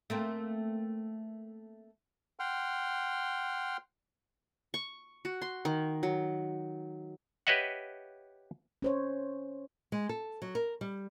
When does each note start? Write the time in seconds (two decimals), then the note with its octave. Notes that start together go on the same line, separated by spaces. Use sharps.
0.10 A3 A#3 C4
2.39 F#5 G5 C6 F6
4.74 C#6
5.25 F#4
5.42 C6
5.65 D#3
6.03 F#3
7.47 G4 B4 C#5 D#5 E5 F#5
8.82 C#4 C5 C#5
9.92 G#3
10.09 A4
10.42 F#3
10.55 A#4
10.81 G3